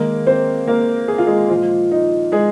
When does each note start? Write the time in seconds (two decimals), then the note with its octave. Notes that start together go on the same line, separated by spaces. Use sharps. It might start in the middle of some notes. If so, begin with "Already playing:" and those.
Already playing: D#3 G#3 A#3 A#4
0.27 C4 C5
0.67 A#3 A#4
1.08 G#4
1.18 F4
1.27 G#3 G#4
1.49 A#2 F3 G#3 F4
1.92 D#4
2.32 G#3 G#4